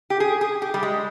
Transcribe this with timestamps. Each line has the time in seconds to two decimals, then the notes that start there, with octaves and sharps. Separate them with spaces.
0.10 G4
0.20 G#4
0.41 G#4
0.62 G4
0.74 G3
0.83 G#3